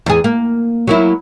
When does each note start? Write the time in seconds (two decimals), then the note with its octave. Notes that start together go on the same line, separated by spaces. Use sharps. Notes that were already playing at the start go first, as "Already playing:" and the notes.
0.06 E2 G#4
0.24 A#3
0.87 F#3 A#3 E4